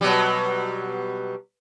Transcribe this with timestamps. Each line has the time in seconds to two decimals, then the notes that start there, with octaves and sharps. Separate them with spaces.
0.01 B2 F#3 G3